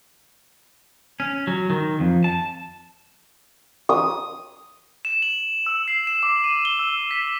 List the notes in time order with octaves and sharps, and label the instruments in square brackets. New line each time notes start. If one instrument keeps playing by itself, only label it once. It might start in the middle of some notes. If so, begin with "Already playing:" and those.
[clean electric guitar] C#4
F#3
D#3
F2
A5
[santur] D#6
[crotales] E7
F#7
E6
C7
E7
D6
D#7
G7
E6
B6